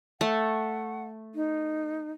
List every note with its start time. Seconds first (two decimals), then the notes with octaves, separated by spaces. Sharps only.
0.21 A3 F#5
1.35 D#4